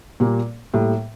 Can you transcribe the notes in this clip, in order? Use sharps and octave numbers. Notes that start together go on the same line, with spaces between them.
A#2 G3 A#3
A2 G3 A#3